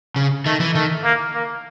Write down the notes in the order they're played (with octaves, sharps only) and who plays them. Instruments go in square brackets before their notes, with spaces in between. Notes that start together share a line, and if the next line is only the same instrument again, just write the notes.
[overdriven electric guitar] C#3
[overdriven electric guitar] D#3 [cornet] A3
[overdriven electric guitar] E3
[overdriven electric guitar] D#3 [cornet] A3
[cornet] A#3
A#3